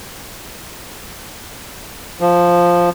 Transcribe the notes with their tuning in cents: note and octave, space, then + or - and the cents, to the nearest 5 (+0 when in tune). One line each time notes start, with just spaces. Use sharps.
F3 +0